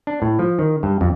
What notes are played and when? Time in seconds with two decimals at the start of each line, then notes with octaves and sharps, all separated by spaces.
0.07 D4
0.22 A2
0.39 F3
0.59 D#3
0.83 G2
1.01 F2